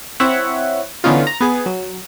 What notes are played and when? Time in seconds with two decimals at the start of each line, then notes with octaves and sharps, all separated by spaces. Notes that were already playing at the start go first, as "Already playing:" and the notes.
0.20 C4 E4 C#5 E5 F#5
1.04 D3 E3 B3 C#4 D#4 F4
1.27 A#5
1.41 B3 G#4
1.66 F#3